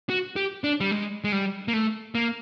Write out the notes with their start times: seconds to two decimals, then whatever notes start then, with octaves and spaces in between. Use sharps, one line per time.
0.10 F#4
0.36 G4
0.64 D4
0.81 G3
0.91 G#3
1.24 G#3
1.32 G3
1.68 A#3
1.73 A3
2.15 A#3